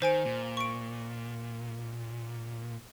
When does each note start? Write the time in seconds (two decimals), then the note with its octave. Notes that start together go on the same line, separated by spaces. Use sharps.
0.02 D#3 C5 G#5 D7
0.25 A#2
0.57 C#6 D7